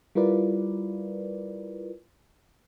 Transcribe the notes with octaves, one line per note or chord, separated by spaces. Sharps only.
G3 E4 F4 A#4 B4 D5